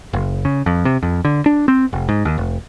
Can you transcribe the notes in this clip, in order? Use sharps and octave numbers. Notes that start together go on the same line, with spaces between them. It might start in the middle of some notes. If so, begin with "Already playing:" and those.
F#1
C#3
F2
C3
F2
D3
D4
C4
F1
G#2
D#2
F1